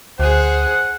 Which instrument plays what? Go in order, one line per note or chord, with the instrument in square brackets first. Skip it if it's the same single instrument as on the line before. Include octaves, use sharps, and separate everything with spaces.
[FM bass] D2 [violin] G#4 C5 [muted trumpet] F#5